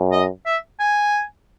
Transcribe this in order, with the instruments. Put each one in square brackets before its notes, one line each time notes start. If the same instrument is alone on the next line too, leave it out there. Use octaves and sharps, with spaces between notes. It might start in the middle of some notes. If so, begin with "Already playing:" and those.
Already playing: [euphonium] F#2
[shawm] D#5
E5
G#5